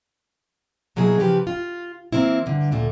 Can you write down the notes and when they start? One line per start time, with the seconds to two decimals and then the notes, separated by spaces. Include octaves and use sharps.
0.96 B2 F#3 A#3 E4 G#4
1.19 C#3 E3 F3 G4 B4
1.47 F4
2.12 E3 A#3 C4 E4
2.46 G2 D3
2.72 D2 A#2 A3